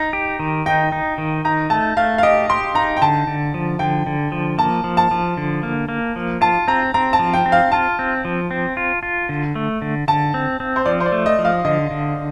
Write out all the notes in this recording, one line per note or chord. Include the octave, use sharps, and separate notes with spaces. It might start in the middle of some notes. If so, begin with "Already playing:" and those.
Already playing: D#4 A#5
G4
D#3
D#4 G5
D#4
D#3
D#4 A#5
A3 A5
A3 F5
F5
G4 D#5
G4 C6
D#4 A#5
G5
D3 A5
D3
F3
D3 G5
D3
F3
A#3 A5
F3
A5
F3
D3
A#3
A#3
F3
F4 A5
C4 A#5
C4 A#5
A5
F3
G5
C4
F5
F4 A5
C4
F3
C4
F4
F4
D3
A3
D3
D3 A5
C4
C4
C5
F3 D5
C5
D5
A3
D#5
F3
F5
D3 D#5
D3